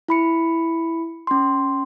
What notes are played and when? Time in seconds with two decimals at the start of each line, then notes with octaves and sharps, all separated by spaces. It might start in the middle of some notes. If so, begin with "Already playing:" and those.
0.08 E4 B5 C#7
1.27 C#4 C6